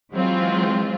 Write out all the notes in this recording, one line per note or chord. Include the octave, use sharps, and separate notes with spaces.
E3 F#3 G#3 C4 F4